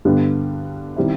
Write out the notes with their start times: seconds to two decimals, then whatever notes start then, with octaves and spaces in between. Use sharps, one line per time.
0.05 G2 D3 G3 B3
0.96 D#3 G3 C4 E4